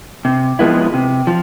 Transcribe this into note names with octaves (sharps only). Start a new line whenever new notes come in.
C3
F3 G#3 B3 E4
C3
F3